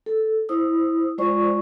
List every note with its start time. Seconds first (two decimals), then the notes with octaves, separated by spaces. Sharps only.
0.06 A4
0.49 E4 C5 D#6 E6
1.18 G#3 F4 C5 D5 C#6